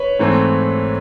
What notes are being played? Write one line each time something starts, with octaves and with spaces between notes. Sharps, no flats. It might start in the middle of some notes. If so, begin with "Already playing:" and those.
Already playing: B4 C#5
G#2 E3 A3 C4